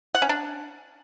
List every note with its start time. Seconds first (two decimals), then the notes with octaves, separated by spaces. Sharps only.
0.15 F#5
0.22 C#4
0.29 D4